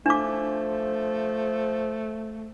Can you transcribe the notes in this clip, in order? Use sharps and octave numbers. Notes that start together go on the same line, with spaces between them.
F3 A3 D4 D6